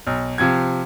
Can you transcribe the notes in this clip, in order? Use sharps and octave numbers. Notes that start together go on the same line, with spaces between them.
B1
C3 F3 G#6